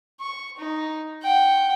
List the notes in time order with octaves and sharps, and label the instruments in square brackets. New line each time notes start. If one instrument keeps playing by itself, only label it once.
[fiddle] C#6
D#4
F#5 G5